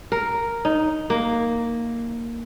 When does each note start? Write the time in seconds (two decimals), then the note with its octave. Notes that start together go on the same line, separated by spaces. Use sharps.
0.12 A#4
0.65 D#4
1.10 A#3